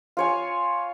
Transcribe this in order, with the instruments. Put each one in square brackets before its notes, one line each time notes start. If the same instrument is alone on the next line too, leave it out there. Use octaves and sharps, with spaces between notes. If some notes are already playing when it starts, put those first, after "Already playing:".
[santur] F4 C#5 G#5